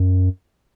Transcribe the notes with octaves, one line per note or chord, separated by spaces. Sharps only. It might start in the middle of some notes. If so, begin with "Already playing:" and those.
Already playing: F#2